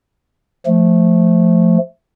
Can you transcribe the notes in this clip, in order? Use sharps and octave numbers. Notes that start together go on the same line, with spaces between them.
F3 A3